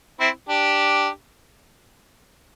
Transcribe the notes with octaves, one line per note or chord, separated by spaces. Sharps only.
C4 E4
D4 G4